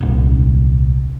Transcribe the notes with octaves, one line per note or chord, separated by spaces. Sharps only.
D#1 C2